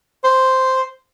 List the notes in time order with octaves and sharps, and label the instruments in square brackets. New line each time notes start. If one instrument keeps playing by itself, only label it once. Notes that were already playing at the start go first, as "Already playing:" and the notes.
[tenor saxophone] C5